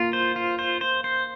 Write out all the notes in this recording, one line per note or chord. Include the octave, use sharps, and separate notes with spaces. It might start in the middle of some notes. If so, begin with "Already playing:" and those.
Already playing: A#3 F4
C5
F4
C5
C5
C5